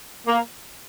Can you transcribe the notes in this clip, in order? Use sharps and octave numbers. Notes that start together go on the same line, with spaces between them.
A#3